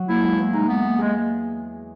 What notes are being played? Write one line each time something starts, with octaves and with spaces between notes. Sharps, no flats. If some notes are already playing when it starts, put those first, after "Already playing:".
Already playing: F#3
A#3 E4
G#3
E2
G#3 D#4
G#3 B3
A#3
G#3 G#4